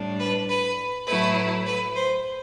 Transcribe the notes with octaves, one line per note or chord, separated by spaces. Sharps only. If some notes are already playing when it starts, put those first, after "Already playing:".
Already playing: A2 G3 D4
B4
B4
A2 F#3 A3 E4 B4
B4
C5